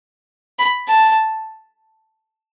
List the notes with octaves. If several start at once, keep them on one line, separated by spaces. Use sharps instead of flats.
B5
A5